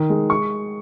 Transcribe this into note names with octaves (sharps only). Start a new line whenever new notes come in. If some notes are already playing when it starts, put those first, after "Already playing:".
Already playing: D#3
G#3
C#6